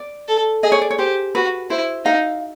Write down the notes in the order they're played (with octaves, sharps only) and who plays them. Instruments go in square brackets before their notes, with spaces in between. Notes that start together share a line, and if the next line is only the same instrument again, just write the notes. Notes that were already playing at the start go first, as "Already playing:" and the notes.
Already playing: [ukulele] D5
[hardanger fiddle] A4
[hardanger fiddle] G#4 [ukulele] D#5
[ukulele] C#5
D5
C#5
[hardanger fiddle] G4 [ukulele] C5
[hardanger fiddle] F#4 [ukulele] B4
[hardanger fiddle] E4 [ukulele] C5
[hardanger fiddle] D#4 [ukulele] F5